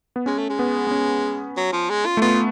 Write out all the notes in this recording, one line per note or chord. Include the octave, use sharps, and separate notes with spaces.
B3
G#3 C#4
A3
G#3
B3
B3
C#4
F#3
F3
G#3
F4
A3
B3 F4